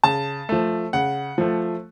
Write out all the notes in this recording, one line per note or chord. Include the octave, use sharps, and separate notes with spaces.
C#3 A5
F3 A3
C#3 F#5
F3 A3